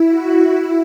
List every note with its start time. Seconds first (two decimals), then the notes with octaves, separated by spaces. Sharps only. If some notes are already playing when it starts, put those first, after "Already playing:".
Already playing: E4
0.08 F#4
0.54 E4